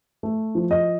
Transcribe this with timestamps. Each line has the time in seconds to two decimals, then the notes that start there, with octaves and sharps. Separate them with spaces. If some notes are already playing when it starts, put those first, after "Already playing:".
0.23 A3
0.55 F3
0.71 D#5